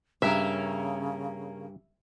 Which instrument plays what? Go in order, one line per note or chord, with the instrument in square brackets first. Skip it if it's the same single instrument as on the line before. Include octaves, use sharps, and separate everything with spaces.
[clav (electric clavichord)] G2 [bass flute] C#3 [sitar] A#3 C#4 A#4 [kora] E5